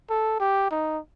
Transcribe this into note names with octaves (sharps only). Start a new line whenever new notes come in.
A4
G4
D#4